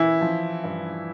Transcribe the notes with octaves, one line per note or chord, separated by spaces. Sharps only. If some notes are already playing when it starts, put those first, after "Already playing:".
Already playing: E3 E4
F3
G2